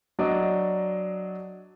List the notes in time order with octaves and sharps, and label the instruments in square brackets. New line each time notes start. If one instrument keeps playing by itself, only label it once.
[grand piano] F#3 D4 D5 D#5